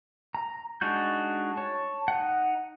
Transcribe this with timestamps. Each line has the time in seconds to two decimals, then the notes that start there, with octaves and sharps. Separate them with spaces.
0.35 A#5
0.81 G#3 D4 D#4 F#4 G6
1.57 C#5 A5
2.08 D#4 F#5